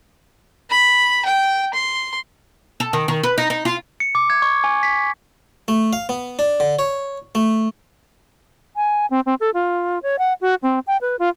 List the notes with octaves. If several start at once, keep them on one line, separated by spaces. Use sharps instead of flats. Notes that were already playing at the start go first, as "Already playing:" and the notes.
B5
G5
C6
A4
D#3
D#3
B4
D#4
D#4
F4
C#7
D6
G#6
C#6
G#5
B6
A3
F5
B3
D4
D3
C#5
A3
G#5
C4
C4
A4
F4
C#5
F#5
F#4
C4
G5
B4
F4